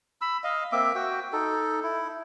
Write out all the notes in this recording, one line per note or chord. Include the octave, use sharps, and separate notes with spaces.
B5 E6
D#5 F5
A#3 C4 E5 D6
F#4 G5
D#4 A4
E4